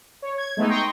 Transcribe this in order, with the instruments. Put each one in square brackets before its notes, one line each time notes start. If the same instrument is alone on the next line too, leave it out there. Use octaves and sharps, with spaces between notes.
[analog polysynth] C#5
G#6
G#3 A3 B3 D#4
G5 A#5 C6 C#6 D#6